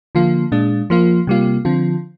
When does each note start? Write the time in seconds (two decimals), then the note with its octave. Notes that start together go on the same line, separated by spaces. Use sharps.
0.15 D3 F3 A#3 F4
0.52 A#2 G#3 D4
0.90 F3 A#3 F4
1.27 C3 G3 A#3 F4
1.65 D3 F3 C4 F4